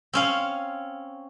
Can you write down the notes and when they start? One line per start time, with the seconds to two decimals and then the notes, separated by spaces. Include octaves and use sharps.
0.13 C4 C#4 F5